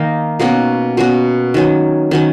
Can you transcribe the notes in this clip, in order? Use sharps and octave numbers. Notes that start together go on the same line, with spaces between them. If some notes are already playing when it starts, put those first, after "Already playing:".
Already playing: D#3 A#3 D#4 A#4
B2 A#3 C#4 F#4
B2 A#3 C#4 F#4
D#3 F#3 C#4
D#3 F#3 C#4